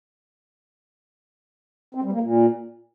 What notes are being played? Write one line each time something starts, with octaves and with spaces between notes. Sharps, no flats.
C4
G3
A#3
A#2